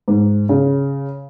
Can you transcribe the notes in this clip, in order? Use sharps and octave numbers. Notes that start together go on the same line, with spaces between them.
G#2
C#3